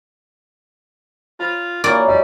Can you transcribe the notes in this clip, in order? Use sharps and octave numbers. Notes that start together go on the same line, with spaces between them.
F4 B5
E3 F#3 A#3 F4 D5
G3 D#5